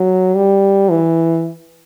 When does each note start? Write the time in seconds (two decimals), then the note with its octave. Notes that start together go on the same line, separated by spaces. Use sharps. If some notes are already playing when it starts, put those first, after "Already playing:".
Already playing: F#3
0.35 G3
0.91 E3